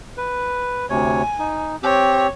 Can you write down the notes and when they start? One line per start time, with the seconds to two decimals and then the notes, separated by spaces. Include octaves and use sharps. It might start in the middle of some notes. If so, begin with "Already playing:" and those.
0.17 B4
0.90 D2 C3 C#5 G#5
1.39 D#4
1.83 C4 G4 C#5